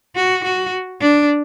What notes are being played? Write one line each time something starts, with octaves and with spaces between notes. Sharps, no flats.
F#4
F#4
D4